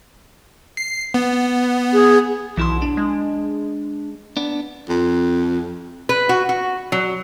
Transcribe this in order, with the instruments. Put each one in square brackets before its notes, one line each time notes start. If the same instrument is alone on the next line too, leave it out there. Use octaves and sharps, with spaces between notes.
[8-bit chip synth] C7
B3
[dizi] G#4
[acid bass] B1 [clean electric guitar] E3 E4 C6
[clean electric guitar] D4
[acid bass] G#3
[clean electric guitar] B3 D4
[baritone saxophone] F2
[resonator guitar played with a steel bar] B4
F#4
F#4
F#3